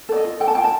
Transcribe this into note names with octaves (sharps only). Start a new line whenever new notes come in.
A4 D5
D#5
F4
A4 G5
A5
F4 G5
A5